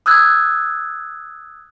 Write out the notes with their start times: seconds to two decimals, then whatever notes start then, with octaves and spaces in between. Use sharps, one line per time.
0.06 D#6 E6 F#6 G#6